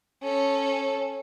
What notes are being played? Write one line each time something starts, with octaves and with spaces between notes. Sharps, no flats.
C#4 A4